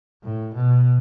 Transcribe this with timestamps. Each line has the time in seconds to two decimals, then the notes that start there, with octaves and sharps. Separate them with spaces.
0.24 A2
0.55 B2